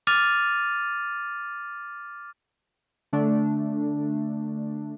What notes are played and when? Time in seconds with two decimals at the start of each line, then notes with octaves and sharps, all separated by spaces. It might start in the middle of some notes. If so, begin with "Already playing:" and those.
0.07 D6 F6 A6 D#7 F7
3.13 D3 A3 D4